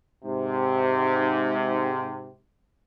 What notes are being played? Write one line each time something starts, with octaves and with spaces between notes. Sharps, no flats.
G#2 C3